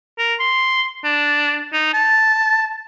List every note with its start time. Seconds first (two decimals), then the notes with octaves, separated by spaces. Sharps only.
0.18 A#4
0.39 C6
1.04 D4
1.73 D#4
1.94 A5